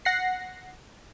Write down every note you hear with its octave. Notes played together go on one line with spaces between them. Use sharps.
F#5 A#6 C7